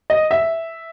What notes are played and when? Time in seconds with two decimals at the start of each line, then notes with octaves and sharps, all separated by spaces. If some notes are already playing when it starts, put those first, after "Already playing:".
0.10 D#5
0.31 E5